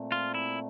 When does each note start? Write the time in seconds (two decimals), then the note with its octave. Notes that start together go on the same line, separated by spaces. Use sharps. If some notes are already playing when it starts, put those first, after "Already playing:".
Already playing: A#2 A3 C4
0.12 F4
0.34 E4